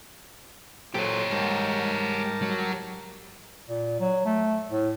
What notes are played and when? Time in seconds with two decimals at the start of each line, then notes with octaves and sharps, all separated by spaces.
0.94 A#2 F#3 G4 A4 C5 C#5
1.32 G#2 G3 A#4 A5
2.42 F#3
3.68 A#2
4.00 F#3
4.25 A3
4.71 A2